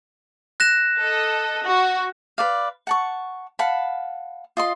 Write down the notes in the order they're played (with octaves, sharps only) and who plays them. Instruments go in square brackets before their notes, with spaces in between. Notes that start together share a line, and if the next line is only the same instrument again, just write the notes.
[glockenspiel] F#6 A#6 E7
[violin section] A4 D#5
F#4
[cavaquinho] B4 D5 F5
F#5 A5 C#6
F5 F#5 A5 B5
F4 D#5 C6